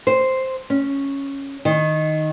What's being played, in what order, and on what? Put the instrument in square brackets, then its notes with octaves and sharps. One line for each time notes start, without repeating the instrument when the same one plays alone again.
[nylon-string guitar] C5
C#4
D#3